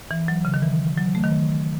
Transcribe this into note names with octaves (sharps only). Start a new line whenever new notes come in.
E3
F#3
C#3
D#3
E3
F#3
A3
D#3